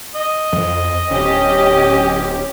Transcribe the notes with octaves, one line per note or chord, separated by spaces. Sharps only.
D#5
F2
D1 C#4 G4